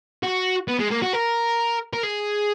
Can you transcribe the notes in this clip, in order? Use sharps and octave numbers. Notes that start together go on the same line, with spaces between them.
F#4
B3
G#3
A#3
F#4
A#4
A#4
G#4